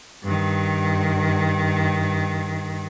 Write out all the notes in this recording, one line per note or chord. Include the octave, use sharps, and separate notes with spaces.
G2 D#3